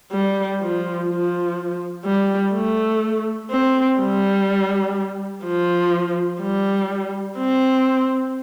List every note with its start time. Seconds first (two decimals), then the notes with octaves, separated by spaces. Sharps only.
0.12 G3
0.60 F3
1.09 F3
2.05 G3
2.53 A3
3.50 C4
4.00 G3
5.45 F3
6.41 G3
7.38 C4